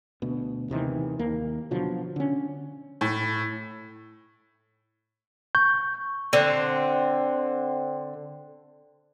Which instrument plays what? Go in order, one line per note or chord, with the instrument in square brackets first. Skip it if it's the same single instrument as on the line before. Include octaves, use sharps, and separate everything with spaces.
[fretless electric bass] D2 B2
D#2 C3 D#3 E3
D#2 A#3
B2 D3 F3 F#3
D3 C#4
[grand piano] A2
[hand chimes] C#6 [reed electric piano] G6
[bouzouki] D3 C4